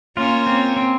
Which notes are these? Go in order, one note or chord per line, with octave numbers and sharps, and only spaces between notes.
A#3 C#4 F4
C4
C4